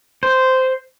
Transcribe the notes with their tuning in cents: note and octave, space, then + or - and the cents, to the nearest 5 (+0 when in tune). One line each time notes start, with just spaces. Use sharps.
C5 -10